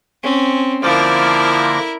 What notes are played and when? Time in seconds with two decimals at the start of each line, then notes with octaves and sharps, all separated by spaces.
0.23 C4 C#4
0.84 D3 F3 A#3 E4 A#4 D5 A#6